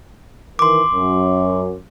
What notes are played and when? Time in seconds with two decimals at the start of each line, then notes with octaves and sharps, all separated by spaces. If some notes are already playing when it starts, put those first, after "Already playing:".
0.59 D#3 E3 A#4 C6 D6
0.91 F#2